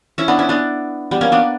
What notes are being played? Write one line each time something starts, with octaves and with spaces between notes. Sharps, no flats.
C#4 E4
B3 D4
C#4 E4
B3 D4
G3 B3
A#3 C#4
B3 D4